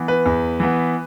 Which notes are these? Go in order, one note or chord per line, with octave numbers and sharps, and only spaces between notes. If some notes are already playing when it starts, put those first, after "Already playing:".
Already playing: E3 B3
B4
E2
E3 B3